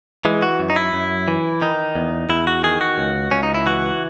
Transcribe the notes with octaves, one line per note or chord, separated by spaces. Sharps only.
E3 G#3
F#4
F#2
D#4
E4
F#2
E3
D#3 D#4
E2
E2 E4
F#4
D#3 G#4
F#4
C#2
C#2 C#4
D#4
E4
E3 F#4